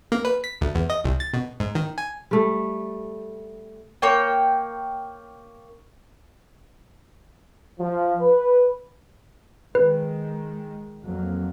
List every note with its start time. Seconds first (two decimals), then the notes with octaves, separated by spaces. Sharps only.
0.12 A#3
0.25 B4
0.44 B6
0.61 D2
0.75 E2
0.90 D#5
1.04 C2
1.20 A6
1.34 B2
1.60 G#2
1.75 D#3
1.98 G#5
2.31 G3 A3
4.02 A#3 C#5 G5
7.80 F3
8.20 B4
9.75 D#3 G#3 B4
11.04 F2 F#3 A#3